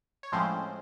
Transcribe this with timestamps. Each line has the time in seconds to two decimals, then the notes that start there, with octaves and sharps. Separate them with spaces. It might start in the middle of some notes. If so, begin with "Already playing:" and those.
0.23 C#5
0.32 A2 F3 G#3 C4 C#4 C5